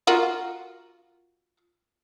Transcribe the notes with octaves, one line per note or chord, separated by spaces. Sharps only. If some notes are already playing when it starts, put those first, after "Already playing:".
F4 F#4 A#4